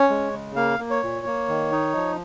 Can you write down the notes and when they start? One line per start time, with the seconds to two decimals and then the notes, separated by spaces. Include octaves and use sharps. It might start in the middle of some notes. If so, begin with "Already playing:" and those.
Already playing: C#4 C#5
0.10 G#3
0.33 C#3
0.56 A#3 F5
0.80 A#3
0.90 C#5
1.03 A#2
1.26 A#3
1.48 D#3
1.72 D#4
1.95 F3